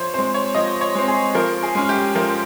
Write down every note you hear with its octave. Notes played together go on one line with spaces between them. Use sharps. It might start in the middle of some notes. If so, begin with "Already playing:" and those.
Already playing: F3 C5 C#5
G#3 C4 C5
C#5
F3 D#5
C#5
G#3 C4
G#4
F3 A#4
G#4
G#3 C#4
G4
F3 A#4